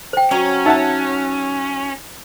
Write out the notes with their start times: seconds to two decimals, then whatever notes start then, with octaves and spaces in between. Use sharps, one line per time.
0.13 C5 G5
0.31 F#3 C#4 G#5 A#5
0.66 D#4 E5 F#5 A5